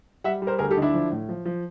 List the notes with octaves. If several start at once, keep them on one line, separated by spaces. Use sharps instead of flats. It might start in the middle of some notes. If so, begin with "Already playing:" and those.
G3 E5 F#5
G3
A#4 C5
D2 G#4 A#4
G4 A4
D3 D#4
D4 E4
F3
A2
F3
F3